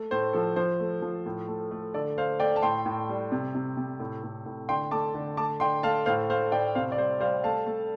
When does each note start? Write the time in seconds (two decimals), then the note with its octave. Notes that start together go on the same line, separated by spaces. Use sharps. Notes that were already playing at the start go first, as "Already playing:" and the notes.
Already playing: A3
0.11 A2 C5
0.33 F3 A4
0.56 F3 C5
0.80 A3
1.02 F3
1.26 A2
1.48 A3
1.71 A3
1.94 D3 A4 D5
2.17 A3 C5 F5
2.40 A3 D5 G5
2.56 A5
2.62 A2 G5 C6
2.85 A2
3.09 G3
3.32 C3
3.55 C3
3.77 C3
4.00 A2
4.23 A2
4.46 A2
4.68 D3 G5 C6
4.91 A3 A5 D6
5.15 D3
5.37 A3 A5 D6
5.60 D3 G5 C6
5.83 A3 F5 A5
6.06 A2 C5 F5
6.29 A3 C5 F5
6.52 A2 D5 G5
6.75 C3 C5 F5
6.92 D5
6.97 G3 C5
7.20 G3 C5 F5
7.44 A3 F5 A5
7.66 A3